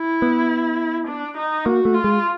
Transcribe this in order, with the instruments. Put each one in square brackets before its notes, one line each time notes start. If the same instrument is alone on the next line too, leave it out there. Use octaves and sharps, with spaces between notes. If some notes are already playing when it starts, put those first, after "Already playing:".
Already playing: [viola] E4
[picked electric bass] B3
[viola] D4
D#4
[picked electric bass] A#3 [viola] F#4
[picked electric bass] A3
[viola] F4
[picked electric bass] G#3